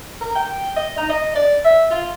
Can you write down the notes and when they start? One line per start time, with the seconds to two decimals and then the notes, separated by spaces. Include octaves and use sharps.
0.21 A#4
0.35 G5
0.76 D#5
0.97 D#4
1.09 D#5
1.35 D5
1.64 E5
1.91 F4